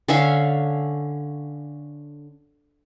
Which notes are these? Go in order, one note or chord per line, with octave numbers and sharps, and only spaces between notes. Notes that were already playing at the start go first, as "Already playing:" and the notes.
D3 C#4 E5 F5